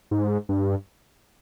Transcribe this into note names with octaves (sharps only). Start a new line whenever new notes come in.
G#2
G2